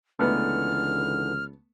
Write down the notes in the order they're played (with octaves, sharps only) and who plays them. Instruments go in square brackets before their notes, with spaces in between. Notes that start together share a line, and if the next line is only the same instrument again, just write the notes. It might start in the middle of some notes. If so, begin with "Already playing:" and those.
[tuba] C#2 [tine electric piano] D3 E3 D#4 [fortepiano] A3 B3 [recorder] F6